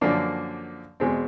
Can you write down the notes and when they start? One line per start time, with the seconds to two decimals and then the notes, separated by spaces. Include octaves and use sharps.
0.01 F#2 D3 F3 A#3 D4
1.00 E2 B2 G#3 C4